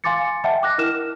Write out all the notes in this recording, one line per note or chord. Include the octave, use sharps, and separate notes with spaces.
F5 G#5 C6 D6 A6 C#7
D#5 E5 F#5 G5 A5
D6 F#6 A#6
E4 A#4 F6 E7